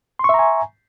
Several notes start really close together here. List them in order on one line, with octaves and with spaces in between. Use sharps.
C6 C#6 E5 A#5 G#5